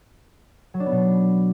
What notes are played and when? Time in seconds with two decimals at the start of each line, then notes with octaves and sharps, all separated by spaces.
0.74 F#3
0.80 D4
0.86 B3
0.92 B2